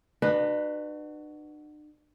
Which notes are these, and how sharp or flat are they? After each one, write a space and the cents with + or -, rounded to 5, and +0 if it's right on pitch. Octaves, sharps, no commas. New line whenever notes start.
D4 +45 F#4 +5 B4 +0